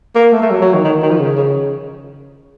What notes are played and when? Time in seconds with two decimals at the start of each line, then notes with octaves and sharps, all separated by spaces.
0.15 A#3
0.32 A3
0.43 A3
0.51 F#3
0.62 F#3
0.74 D#3
0.84 D#3
1.02 D#3
1.11 F3
1.19 C#3
1.37 C#3